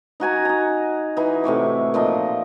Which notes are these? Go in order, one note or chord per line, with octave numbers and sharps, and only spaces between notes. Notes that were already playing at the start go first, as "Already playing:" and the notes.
D#4 F#4 G#5 A#5
D#4 A#5
E3 D#4
A2 C3 C#6 D6
A#2 F3 D#4 D#5